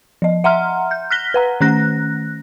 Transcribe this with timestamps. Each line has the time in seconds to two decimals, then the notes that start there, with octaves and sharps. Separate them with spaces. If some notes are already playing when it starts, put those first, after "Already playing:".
0.22 F3 D#5
0.44 E5 F#5 A#5 C6 F6
0.91 G6
1.10 F6 F#6 A#6 B6 G7
1.34 B4 F#5 A#5
1.61 D#3 A3 C#4 F#6 A#6